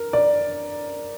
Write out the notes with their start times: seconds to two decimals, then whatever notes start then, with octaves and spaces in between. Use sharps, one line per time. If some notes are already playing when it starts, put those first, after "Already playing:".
Already playing: A#4
0.13 D5